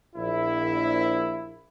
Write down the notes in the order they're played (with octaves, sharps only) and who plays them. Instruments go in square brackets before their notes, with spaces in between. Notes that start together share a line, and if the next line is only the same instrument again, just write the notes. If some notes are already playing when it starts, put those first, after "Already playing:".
[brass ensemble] A#1 E4